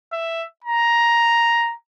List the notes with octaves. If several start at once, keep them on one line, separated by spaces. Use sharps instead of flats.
E5
A#5